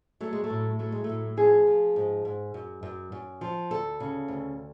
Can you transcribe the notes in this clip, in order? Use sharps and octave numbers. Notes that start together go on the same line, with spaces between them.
F#3 A3
G#3
A3
A2
F#3 A3
G#3
A2 A3
F3 G#4
F3
G#2
G#2
F#2
F#2
F#2
F3
D2 A4
C#3
D2